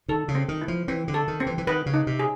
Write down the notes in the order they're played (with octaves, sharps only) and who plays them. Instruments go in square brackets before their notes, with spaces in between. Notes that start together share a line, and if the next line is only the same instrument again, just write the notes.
[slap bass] D#3 [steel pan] A4
[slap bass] C#3
[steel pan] C4
[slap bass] D#3
[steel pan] E4
[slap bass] F3
[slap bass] E3 [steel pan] C4
[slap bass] D3
[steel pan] A4
[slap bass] D#3
[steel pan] C4
[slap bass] E3
E3
[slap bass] D#3 [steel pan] B4
[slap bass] C#3
[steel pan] D#4
[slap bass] C3
[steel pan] G#4